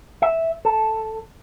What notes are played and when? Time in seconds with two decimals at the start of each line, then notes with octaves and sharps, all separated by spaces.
0.22 E5
0.65 A4